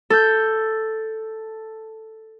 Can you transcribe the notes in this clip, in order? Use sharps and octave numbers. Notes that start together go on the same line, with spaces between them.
A4 G6